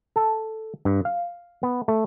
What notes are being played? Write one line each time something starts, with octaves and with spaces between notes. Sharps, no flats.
A4
G2
F5
B3
A3